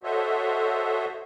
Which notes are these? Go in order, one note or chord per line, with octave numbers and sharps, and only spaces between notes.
F#4 A4 C5 C#5 D#5 E5